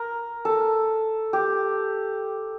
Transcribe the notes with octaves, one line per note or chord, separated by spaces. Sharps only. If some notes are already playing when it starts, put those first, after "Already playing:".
Already playing: A#4
A4
G4